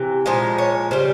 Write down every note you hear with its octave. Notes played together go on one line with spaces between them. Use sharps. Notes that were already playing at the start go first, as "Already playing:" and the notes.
Already playing: C3 E3
A#2 F3 G#3 C5
C#5
C#3 G3 C5